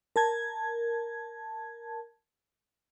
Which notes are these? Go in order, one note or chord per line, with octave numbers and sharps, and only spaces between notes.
A#4 A5 G#6